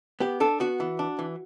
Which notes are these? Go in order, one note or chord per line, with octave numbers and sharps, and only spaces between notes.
B3 G4
D4 A4
B3 F#4
E3
D4
E3